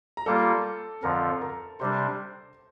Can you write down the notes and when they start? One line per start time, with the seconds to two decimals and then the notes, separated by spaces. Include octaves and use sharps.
0.17 A#5
0.26 G3 A#3 F4 A4 A5
1.03 F2 D3 F3 A#4 A#5
1.41 A#4 A#5
1.80 C3 G3 D4 C5 C6